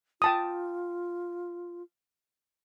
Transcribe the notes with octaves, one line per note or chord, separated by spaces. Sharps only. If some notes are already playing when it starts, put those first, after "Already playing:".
F4 G5 A5 D#6